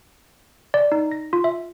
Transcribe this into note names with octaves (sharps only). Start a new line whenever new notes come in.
D5
D#4
A#6
F4
E5